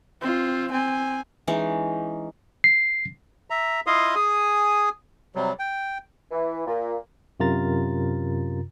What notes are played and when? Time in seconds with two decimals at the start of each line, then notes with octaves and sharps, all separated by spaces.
0.21 C4 F4
0.72 C4 G#5
1.47 E3 G#3 C#4 D#4
2.64 C7
3.50 E5 A#5
3.87 E4 F4 D#5 F5 C6 D#6
4.15 G#4 G#5 D#6
5.35 C3 F#3 G3
5.59 G5
6.31 E3
6.66 A#2
7.40 F#2 C3 F4 A#4 A#5 A6